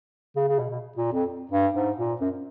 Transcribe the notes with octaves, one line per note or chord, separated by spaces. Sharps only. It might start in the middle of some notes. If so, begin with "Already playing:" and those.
C#3
C#3
B2
B2
A#2
F2
G2
G#2
A#2
F#2